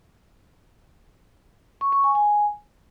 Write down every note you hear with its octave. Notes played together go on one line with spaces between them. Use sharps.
C#6
C#6
G#5
G#5